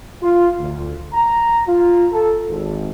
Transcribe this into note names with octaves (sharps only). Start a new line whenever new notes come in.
F4
D2
A#5
F4
A4
G#1